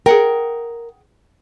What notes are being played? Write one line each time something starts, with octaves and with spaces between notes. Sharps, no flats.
G#4 A#4 F#5 G5